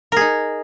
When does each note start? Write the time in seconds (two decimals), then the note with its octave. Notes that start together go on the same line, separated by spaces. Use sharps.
0.12 A#4
0.17 G#4
0.21 D#4